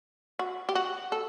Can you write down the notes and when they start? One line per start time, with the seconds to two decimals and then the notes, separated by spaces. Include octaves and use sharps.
0.39 F#4
0.69 G4
0.75 F#4
1.12 A4